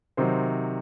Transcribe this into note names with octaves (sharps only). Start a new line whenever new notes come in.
C3 D#3 F#3 C5